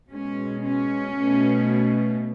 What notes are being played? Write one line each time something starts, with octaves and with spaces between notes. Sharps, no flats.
B2 G#3 C#4
C#4
B2 A3